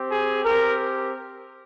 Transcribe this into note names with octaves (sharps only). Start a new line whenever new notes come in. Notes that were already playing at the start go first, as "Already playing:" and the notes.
Already playing: C4 G4
G#4
C4 G4 A#4